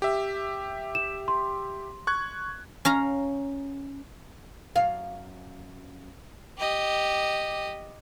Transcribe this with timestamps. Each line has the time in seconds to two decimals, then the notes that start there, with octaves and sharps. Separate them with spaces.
0.02 G4 E5
0.95 E7
1.28 C6
2.07 C#6 F#6 G#6
2.85 C#4 F5 A#5
4.76 F#2 F5
6.59 G4 D#5